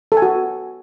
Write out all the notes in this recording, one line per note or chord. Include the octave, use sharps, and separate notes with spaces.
A4
G#5
F#4